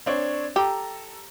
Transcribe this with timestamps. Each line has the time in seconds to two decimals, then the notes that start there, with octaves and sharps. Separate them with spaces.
0.06 C4 D4 C#5
0.56 G4 A4 A#5